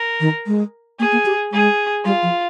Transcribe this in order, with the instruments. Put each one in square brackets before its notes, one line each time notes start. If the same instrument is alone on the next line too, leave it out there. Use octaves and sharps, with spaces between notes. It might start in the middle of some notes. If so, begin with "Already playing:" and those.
Already playing: [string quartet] A#4
[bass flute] D#3
G#3
[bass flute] A#3 [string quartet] G#4
[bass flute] A#3
G4
[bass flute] G#3 [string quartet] G#4
[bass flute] G3 [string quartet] F4
[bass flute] F3